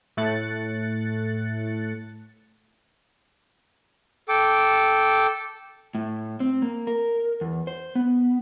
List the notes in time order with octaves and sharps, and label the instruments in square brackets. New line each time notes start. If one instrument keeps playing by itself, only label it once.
[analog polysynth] A2 A3 F#6 A6 C#7
[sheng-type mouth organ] A4 G5 D6
[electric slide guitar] A2
C4
A#3
A#4
E2
C5
B3